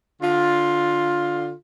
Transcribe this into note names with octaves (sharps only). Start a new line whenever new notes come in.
D3 F4